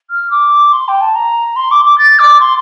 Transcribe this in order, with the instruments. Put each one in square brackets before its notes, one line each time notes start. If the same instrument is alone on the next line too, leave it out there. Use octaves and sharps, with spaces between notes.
[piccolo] F6
D6
C6
G5
A5
A#5
C6
D6
D6
A6
D6
C6